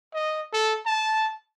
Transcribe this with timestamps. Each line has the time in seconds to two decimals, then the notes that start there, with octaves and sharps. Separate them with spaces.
0.14 D#5
0.53 A4
0.86 A5